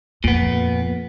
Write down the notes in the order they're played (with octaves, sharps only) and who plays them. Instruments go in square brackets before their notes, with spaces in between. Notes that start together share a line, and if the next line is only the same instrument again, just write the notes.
[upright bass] F2 [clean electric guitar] A#2 B3